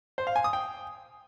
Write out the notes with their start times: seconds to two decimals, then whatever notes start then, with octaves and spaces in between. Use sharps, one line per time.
0.18 C5
0.27 F5
0.36 G#5
0.44 D#6
0.53 G5